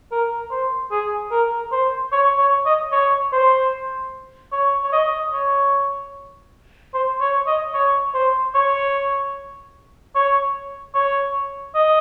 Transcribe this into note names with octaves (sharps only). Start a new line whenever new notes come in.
A#4
C5
G#4
A#4
C5
C#5
C#5
D#5
C#5
C5
C#5
C#5
D#5
C#5
C5
C#5
D#5
C#5
C5
C#5
C#5
C#5
D#5